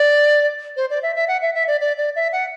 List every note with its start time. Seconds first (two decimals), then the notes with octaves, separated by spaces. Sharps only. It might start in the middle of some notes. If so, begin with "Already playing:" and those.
Already playing: D5
0.77 C5
0.90 D5
1.03 E5
1.16 E5
1.28 F#5
1.42 E5
1.55 E5
1.67 D5
1.81 D5
1.98 D5
2.16 E5
2.33 F#5